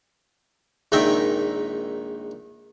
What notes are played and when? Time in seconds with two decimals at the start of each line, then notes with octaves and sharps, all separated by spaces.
0.92 A#1 G#2 D#3 D#5 E5 G5